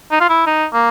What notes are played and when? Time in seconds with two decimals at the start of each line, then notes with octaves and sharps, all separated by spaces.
0.11 D#4
0.21 F4
0.29 E4
0.47 D#4
0.73 A#3